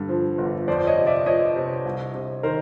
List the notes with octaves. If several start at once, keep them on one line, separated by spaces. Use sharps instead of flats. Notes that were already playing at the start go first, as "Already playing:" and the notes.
Already playing: G2 D3
F3
G1
F2 C5 D5
C#5 D#5
C3
D5 E5
F3 C#5 D#5
C3
C2
C3
D#3 A#4 C5